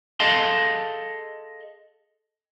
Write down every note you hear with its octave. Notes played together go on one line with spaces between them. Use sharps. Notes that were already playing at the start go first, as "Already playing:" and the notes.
G#4 A4 D#5 F5 A5 C6